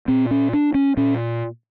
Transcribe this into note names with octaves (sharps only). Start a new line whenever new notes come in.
A#2 C4
C#4
D4
C#4
A#2 C#4